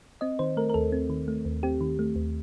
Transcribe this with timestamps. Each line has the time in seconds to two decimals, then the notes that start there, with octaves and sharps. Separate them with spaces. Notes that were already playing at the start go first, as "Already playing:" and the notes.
0.21 C4 D#5
0.39 D#3 C5
0.57 A3 A#4
0.69 A#4
0.74 D#2 A4
0.92 C4
1.10 D#3
1.28 A3
1.45 D#2
1.63 C4 G4
1.81 D#3
1.99 A3
2.16 D#2